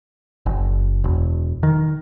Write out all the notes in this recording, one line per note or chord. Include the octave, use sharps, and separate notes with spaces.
F#1
E1
D#3